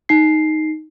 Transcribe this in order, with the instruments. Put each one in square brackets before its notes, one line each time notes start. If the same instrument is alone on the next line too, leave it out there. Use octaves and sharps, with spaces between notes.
[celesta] D#4 C7